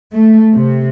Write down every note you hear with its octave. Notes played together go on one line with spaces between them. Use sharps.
A3
C3